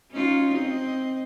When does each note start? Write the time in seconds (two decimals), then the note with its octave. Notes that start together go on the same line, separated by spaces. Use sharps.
0.12 C#4 D#4 F4
0.54 C4 D#5